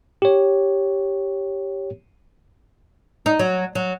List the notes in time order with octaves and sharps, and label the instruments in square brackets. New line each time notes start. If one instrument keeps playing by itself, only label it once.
[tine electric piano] G4 C#5
[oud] D#4
F#3
F#3